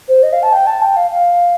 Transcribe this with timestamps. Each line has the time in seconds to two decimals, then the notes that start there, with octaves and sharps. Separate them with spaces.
0.09 C5
0.23 D#5
0.33 F5
0.43 A5
0.53 G5
0.67 A5
0.82 G5
0.97 F5
1.11 F5